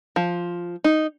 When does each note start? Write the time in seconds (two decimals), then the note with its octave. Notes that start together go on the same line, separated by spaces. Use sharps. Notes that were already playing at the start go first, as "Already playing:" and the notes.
0.16 F3
0.84 D#4